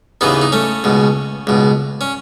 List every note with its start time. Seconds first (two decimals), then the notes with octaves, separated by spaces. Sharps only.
0.21 D#2 C#3 E3 B3 D#4
0.42 D#4
0.52 A3 C#4
0.84 C#2 B2
1.47 C#2 B2
2.01 C#4